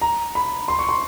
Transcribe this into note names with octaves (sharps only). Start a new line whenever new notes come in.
A#5
B5
C6
C#6
C6